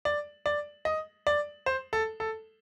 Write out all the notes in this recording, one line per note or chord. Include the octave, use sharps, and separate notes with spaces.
D5
D5
D#5
D5
C5
A4
A4